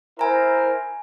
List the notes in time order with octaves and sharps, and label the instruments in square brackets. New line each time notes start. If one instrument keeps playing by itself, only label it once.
[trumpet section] E4 A#4 C5 [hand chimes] G#5 A#5